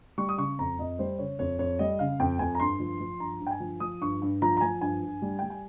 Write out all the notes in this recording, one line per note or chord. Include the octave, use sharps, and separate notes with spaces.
G3 C#6
D#6
C#3 C#6
F2 A#5
F2 D#5
G3 C5
C#3 C#5
F2 C#5
F2 C#5
G3 D#5
C#3 F5
F2 G5
F2 G#5
A#5
G2 C6
F3
F3
G2 A#5
G2
G5
G#5
F3
F3 D#6
G2 C#6
G2
F3 A#5
A#5
F3 G#5
G2 G#5
G2
G3
G3 G5
G#5